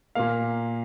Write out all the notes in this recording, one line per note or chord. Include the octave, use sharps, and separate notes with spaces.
A#2 A#3 F5